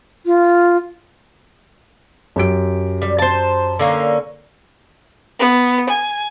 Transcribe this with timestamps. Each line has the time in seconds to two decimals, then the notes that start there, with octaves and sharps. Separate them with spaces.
0.26 F4
2.36 F#2 G4 D7
3.02 G3
3.19 C5 A5
3.79 D3 A#3 C#4
5.38 B3
5.88 G#5